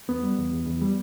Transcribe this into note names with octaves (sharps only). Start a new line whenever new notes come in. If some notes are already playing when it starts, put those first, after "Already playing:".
E2 B3
G3
E2
E2
E2
G3